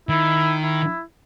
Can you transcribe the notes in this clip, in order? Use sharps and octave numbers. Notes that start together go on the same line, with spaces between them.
D#3 E4
E4